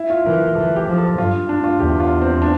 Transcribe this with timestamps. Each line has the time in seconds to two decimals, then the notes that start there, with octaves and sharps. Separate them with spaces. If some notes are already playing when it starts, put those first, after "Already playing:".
Already playing: E4
0.10 F4
0.26 E3 A#4
0.41 A#4
0.56 E3 A4
0.76 G4
0.87 F3
0.98 A4
1.18 G2 F4
1.49 D4
1.64 F4
1.80 E2 G4
2.00 F4
2.21 C4
2.42 D4